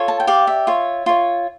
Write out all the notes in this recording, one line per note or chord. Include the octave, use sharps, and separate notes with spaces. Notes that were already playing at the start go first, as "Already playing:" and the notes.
Already playing: F4 A4 C#5
A5
G5
G4 D5 F5
E5
F4 C#5
F4 C#5